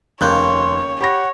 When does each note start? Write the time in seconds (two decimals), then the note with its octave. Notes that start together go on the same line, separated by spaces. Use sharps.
0.21 F1 D#2 C#3 A#3 C#5 C6 F#6 G6
1.01 G4 C#5 F#5 B5 A#6